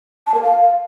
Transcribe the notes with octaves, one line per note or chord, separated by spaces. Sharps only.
A5
A#4
F5